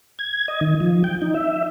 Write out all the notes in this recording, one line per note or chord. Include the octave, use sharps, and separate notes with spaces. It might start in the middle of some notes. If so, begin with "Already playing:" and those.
G#6
D#5
D#3
F3
G5
D#4
E5